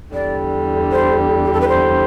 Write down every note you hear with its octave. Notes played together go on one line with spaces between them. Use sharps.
E2 D3 G3 D5
C5
G4
A4
B4
C5